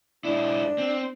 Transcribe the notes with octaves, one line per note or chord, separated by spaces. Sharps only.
G#2 D4 E4
C4